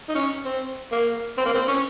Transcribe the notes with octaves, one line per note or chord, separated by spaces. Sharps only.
D#4
C#4
C4
A#3
C4
A#3
C4
C#4